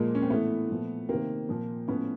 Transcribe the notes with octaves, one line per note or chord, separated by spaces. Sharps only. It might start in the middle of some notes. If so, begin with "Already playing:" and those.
Already playing: A#2 F3 G#3 A#3
C#4
C4
A2 E3 A3 B3
A#2 F3
C3 D#3 A#3 C4
A#2 F3
A2 F3 B3 C#4